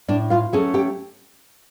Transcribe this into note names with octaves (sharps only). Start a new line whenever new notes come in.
A2 D4 D5
F4 F5
F#3 A3 C#4 G#4 G#5
G4 G5